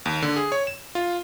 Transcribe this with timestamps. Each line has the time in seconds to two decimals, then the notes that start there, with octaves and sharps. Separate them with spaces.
0.06 D#2
0.22 D3
0.36 G#4
0.52 C#5
0.67 E7
0.95 F4